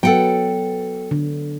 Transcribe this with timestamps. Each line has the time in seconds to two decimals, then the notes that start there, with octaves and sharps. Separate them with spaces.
0.03 F#3 B3 A4 F#5 G5
1.11 D3